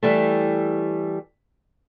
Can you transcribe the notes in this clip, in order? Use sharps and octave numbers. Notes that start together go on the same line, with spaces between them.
E3 G3 A3